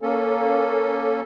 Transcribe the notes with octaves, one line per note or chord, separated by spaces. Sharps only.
A#3 C#4 A4